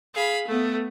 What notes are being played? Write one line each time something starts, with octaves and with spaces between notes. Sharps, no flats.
G#4 F5 B5
A3 B3